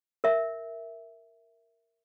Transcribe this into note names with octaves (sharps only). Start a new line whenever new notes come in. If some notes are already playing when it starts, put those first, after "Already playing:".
A#4 E5